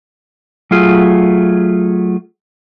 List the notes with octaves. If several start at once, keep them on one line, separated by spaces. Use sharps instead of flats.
F#3 A3 F4 G#4